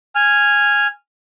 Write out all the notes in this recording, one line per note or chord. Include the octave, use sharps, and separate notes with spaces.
G#5 F6